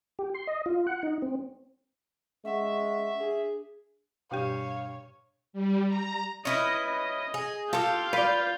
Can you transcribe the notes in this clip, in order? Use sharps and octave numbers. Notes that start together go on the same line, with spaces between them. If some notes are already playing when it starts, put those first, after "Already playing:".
G4
C6
D#5
F4
F#5
D#4
C4
G#3 C#4 E5 F#5 C#6
D4 G#4
G2 B2 G4 C#5 F5 G5 D#7
G3
A#5
C#4 E4 B4 D#5
D#5
G#4
F4 G4 A4 F5 G6
F4 B4 D5